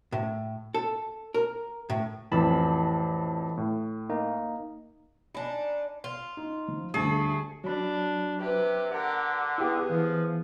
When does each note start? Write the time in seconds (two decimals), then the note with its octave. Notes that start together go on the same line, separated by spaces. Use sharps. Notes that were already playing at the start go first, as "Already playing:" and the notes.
0.12 A2
0.74 A4
1.34 A#4
1.90 A2
2.31 A1 F2 E3 A5 B5
3.58 A2
4.10 A#3 D#4
5.35 D4 D#4 G#5 B5
6.04 F4
6.37 D#4
6.68 F3
6.94 D2 G3 A3 G#4
7.64 F#3 D4 B5
8.40 C3 G4 B4
8.92 D3 G4 A#4 F#5
9.58 B3 E4 G4 G#4
9.90 E3 F3